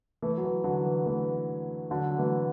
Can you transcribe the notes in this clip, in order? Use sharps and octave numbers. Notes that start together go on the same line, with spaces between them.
E3 A3
F#3
E3
D3 F#3
E3
E3 A3
D3 F#3
F#3
E3 A3